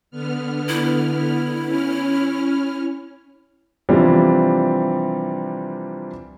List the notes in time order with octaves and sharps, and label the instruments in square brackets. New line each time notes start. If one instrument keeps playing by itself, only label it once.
[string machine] D3 B3 F6
[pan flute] E4
[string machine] C#4 F6
[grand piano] C3 E3 F3 G3 C4 D4